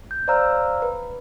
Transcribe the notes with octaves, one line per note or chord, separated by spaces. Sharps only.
G6
C5 D5 F5 A#5 E6 F6
B4